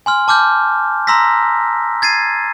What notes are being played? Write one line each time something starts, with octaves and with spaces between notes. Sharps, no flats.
G#5 C6 F6
A5 D6 F6 G6
A#5 C6 E6 A#6 B6
G#6 A6 C7 D#7